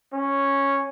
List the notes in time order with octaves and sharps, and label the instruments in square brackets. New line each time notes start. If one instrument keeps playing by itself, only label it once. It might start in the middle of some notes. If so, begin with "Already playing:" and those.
[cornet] C#4